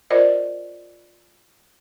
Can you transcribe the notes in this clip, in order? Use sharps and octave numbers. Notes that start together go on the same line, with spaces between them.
F4 A#4 C5 D5 D#5